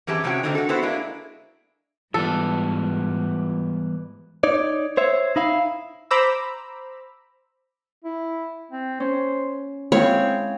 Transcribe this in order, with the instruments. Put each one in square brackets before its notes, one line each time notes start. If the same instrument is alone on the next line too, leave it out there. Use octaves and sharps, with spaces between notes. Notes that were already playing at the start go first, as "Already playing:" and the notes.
[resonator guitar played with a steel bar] F#2 E3 C4 G4 G#4 A5
C3 G#3 C4 C#4 F#4 G5
D3 D#3 G#3 A3 C4 D#4
F#4 A4
B3 C4 E4 F#4 A4 C5
G#3 A#3 D4 E4
[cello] G#2 [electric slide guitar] E3 G3 B3 [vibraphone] F4 [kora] A4
[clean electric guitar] D#4 C#5 D5
C5 C#5 E5
D#4 E4 F5
[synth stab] C5 A#5 B5 D6 E6
[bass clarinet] E4
C4
[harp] C#4 [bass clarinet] C5
[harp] G#3 E4 F5 [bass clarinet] C4 [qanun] C#5